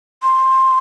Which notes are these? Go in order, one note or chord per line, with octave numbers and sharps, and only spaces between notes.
C6